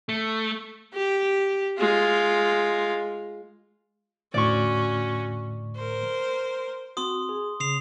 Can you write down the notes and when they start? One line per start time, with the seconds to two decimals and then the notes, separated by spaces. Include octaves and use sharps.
0.09 A3
0.94 G4
1.79 G#3 F4
4.34 E2 A2 D3 C#4 F#4 D5 C#6
5.76 A#4 C5
6.97 C4 F#4 C6 D#6
7.29 G#4
7.60 C#3 D#6 C7 F7